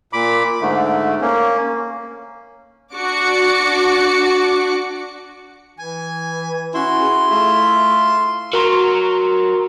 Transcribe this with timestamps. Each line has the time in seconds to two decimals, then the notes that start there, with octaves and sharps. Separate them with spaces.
0.13 A#2 B5 D6
0.61 G#2 D3 A3
1.21 A#3 C#4
2.93 D4 F#4 D6 C#7
5.78 E3 G#5
6.74 C#4 E4 F#4 C6
7.01 G#4
7.31 A3 F4 E5
8.53 F#3 A#4 A#5 C6